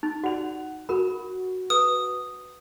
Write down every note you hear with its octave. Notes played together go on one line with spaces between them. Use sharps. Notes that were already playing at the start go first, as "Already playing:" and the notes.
D#4
F#4 D5 F#5 F7
F#4 A#4 B5
B4 D#6